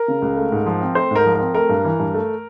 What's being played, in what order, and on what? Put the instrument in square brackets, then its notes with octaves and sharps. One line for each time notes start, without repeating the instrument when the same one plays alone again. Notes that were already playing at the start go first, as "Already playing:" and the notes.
Already playing: [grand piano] A#4
C#3
C#2
A3
G#2
F3
C4
A3 C5
G#2 A#4
F3
A#4
C4
A3 A#4
G2
E3
G2
A3